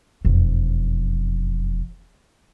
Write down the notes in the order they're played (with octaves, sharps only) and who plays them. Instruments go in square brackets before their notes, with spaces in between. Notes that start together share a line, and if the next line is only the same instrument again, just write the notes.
[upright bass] E1 F2